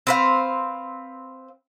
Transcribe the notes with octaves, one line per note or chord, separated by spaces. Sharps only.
C4 B4 F5